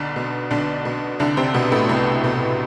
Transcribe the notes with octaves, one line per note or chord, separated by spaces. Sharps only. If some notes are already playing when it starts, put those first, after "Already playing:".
Already playing: B1 D3 D4
B2
B1 D3 D4
B2
C2 D3 D4
C3 C4
B2 B3
A2 A3
C2
B2